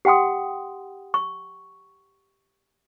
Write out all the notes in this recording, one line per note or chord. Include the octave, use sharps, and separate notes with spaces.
G4 F#5 G5 C6 D#6
C#6